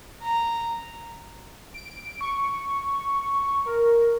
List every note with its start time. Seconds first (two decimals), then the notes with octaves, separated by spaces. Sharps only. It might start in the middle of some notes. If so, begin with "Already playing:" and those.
0.22 A#5
1.74 D7
2.21 C#6
3.66 A#4